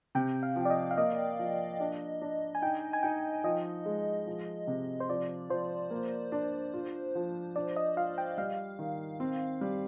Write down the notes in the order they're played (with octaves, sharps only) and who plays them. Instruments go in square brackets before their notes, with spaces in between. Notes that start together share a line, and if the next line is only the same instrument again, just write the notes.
[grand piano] C3 [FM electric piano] G5
[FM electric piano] F5
[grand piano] F3
[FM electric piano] D5
D#5
F5
[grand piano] A#3 [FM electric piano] D#5
[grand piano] F3
D4
D4
[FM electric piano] G#5
[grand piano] D#4 [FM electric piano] G5
[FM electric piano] G#5
[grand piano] D#4 [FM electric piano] G5
[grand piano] F3 [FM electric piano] D#5
[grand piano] G#3
F3
C3
[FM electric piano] C5
[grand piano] F3 [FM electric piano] D5
[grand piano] F3 [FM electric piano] C5
[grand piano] A#3
D4
F4
F3
[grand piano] D4 [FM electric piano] D5
[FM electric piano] D#5
[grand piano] F4 [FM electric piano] F5
[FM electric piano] G5
[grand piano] G3 [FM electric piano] F5
[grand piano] D#3
C4
G3